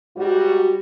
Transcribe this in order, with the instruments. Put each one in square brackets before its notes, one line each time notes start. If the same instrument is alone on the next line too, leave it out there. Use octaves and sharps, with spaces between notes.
[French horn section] G#2 G3 F#4